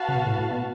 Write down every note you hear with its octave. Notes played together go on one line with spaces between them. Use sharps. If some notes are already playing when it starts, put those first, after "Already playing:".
Already playing: F#4 B4 F5 A5
C#3
B2
A2
A2
B2